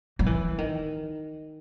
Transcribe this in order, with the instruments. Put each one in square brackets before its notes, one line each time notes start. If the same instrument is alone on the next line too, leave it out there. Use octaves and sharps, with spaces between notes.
[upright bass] F#3
E3
D#3